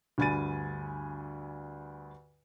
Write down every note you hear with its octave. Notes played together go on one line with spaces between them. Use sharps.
D2 G2 G#5 B5 A6 D#7